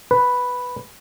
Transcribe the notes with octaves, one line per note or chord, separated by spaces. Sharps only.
B4